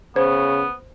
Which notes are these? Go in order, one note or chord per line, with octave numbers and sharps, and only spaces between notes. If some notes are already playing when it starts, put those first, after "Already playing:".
C#3 B3 C5